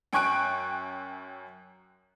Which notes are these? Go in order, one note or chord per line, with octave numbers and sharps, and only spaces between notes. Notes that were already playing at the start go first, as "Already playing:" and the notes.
F#2 G5 G#5 C#6 F#6 D7